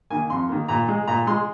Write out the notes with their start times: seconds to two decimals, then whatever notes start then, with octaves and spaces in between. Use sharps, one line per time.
0.10 D#3 A#3 G#5
0.30 F2 C6
0.49 D#3 A#3
0.68 A#2 A#5
0.89 G#3
1.08 A#2 A#5
1.27 G#3 C6